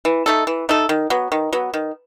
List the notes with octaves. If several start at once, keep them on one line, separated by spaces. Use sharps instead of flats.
E3
A3 D#4 A4
E3
A3 D#4 A4
D#3
F#3 B3
D#3
F#3 B3
D#3